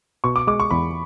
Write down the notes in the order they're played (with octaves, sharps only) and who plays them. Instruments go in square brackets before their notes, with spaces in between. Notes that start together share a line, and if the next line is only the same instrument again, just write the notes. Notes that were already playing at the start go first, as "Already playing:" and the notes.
[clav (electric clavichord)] B2 [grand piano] C#6
[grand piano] D6
[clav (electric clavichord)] G#3 [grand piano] D6
[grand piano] C#6
[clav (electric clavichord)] E2 [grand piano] B5